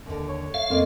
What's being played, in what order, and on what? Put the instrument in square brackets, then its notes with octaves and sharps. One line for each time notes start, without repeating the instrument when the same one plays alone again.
[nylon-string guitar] D#2 D3
[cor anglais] C#5
[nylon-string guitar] E5 [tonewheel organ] F5
[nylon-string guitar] F2 C#3 A#3 [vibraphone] C4 A4 D#5